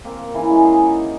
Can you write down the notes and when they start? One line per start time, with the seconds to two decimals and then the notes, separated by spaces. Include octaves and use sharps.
0.05 A#3 C4
0.34 C#3 E3 E4 G#5
0.50 G#3 E4 F#4 D#5
0.65 G#4 A#4
0.87 D#4